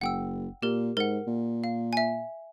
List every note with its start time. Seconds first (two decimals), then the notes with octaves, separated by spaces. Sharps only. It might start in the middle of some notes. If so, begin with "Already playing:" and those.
0.01 F#1 F#5 G5 E6
0.63 A#2 G4 A#4
0.97 G#2 A#4 F#5
1.27 A#2
1.64 F5
1.93 E5 G#5